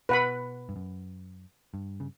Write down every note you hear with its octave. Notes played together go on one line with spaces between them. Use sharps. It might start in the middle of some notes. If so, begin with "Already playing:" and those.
B2 B4 F#5 B5
G2
F#2
G2
C#3